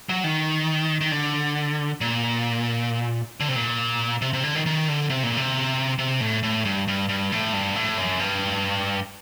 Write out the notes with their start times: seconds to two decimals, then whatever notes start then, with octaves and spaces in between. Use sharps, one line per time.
0.09 F#3
0.24 D#3
1.01 D#3
1.12 D3
2.01 A#2
3.40 D3
3.49 C3
3.56 A#2
4.22 C3
4.33 C3
4.44 D3
4.55 D#3
4.66 D#3
4.89 D3
5.10 C3
5.23 A#2
5.37 C3
5.99 C3
6.21 A2
6.43 A2
6.65 G2
6.88 G2
7.09 G2
7.32 A2
7.53 G2
7.76 A2
7.97 F#2
8.20 G2